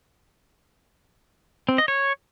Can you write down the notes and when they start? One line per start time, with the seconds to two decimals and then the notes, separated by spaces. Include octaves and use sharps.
1.69 C4
1.78 D#5
1.88 C#5